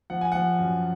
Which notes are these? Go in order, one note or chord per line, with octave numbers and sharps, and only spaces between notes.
F3 F#5
G#5
F3 F#5
F#2